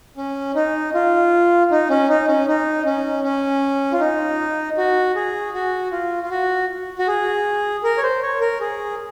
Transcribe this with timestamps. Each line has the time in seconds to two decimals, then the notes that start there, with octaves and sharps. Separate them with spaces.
0.17 C#4
0.55 D#4
0.94 F4
1.71 D#4
1.90 C#4
2.08 D#4
2.27 C#4
2.48 D#4
2.85 C#4
3.23 C#4
3.92 F4
4.00 D#4
4.77 F#4
5.15 G#4
5.54 F#4
5.92 F4
6.23 F4
6.31 F#4
6.99 F#4
7.07 G#4
7.84 A#4
7.97 C#5
8.03 C5
8.22 C#5
8.41 A#4
8.60 G#4